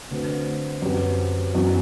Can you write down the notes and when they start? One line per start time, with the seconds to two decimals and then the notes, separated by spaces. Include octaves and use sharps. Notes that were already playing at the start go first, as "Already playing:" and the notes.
0.11 D3 A3 C4 F#4 B4
0.82 F#2 F#3 C4 G4 B4
1.54 F#2 E3 B3 F#4